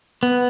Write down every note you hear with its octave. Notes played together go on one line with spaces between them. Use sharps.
B3